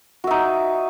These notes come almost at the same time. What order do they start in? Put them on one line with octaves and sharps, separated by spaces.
F#4 E5 D#4